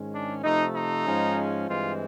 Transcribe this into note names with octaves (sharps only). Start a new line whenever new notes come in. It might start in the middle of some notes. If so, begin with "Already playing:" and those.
Already playing: G#2 D#3 G#3 C#4
D4
C3 F3 A3 D#4
D#4
G#2 F3 G#3 C#4
G2 E3 G#3 C4 F4